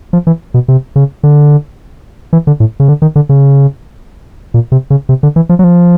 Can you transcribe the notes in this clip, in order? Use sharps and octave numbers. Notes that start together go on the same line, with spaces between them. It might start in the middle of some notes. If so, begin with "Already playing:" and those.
F3
E3
B2
C3
C#3
D3
E3
D3
A2
C#3
D3
D#3
D3
C#3
A#2
C3
C#3
C3
D3
E3
F3
F#3
F3